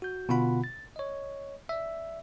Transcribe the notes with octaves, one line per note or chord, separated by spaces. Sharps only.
F#4 G6
B2 D3 B3 F4 F#5 B5
A6
C#5 D#5
D5 E5